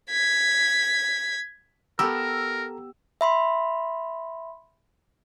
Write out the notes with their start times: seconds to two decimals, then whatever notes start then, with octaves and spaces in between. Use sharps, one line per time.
0.10 G#6 B6
1.99 B3 G4 A4 A#4 A#5 E6
3.21 E5 B5 C6